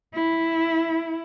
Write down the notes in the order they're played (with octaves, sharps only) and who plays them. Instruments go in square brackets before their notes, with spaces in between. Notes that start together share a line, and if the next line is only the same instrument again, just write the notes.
[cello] E4